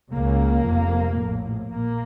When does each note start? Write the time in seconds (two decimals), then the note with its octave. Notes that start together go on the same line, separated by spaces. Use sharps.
0.11 C#2 C#3 A#3
0.65 F1 F2 C3
1.18 A#1 A2
1.72 A#1 A#2 A#3